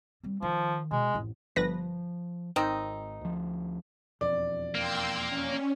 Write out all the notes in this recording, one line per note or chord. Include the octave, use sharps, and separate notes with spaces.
G3 C4
D#3 F3
B2 G#3
A1 F2
G1 F3 B4 A#6
G#1 D#3 C4 D#4
D2 F3
E1 F2 D5
A#3 G5 C6 E6
C#4